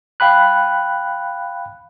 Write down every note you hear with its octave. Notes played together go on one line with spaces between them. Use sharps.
F5 G5 B5 F#6